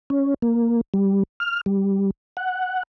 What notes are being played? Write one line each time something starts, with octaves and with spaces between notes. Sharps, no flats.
C#4
A#3
G3
F6
G3
F#5